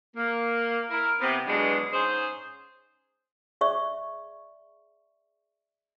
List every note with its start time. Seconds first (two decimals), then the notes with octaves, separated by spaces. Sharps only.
0.16 A#3
0.90 E4 A#4
1.20 C3 B3
1.46 E2 D3 F#3 G#3 B3 D4
1.93 G#2 C#4 G#4 C5
3.61 G#4 D5 E5 C#6